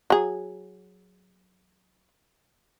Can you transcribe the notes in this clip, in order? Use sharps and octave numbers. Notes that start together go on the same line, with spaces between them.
F#3 G#4